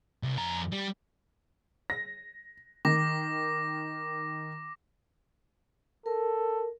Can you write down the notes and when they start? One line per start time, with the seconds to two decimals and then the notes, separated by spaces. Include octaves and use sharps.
0.23 C2
0.38 F2 A#5
0.72 G3
1.90 A#6
2.85 D#3 D6 A#6
6.06 A4 A#4